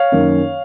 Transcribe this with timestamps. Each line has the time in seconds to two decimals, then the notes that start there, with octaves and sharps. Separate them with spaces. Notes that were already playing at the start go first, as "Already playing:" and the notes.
Already playing: C#5 F5
0.12 F#2 D#3 A#3 C#4